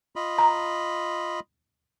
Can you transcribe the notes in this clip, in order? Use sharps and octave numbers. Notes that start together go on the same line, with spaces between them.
F4 D#5 B5
A#5